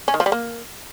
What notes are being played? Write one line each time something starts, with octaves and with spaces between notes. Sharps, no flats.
C#4
D#3
F3
G3
A#3